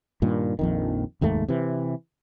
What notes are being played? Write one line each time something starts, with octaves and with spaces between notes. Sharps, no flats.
G2 A#2 D#3
A#1 F2 D#3
F1 D#2 G#2 A3
C3 E3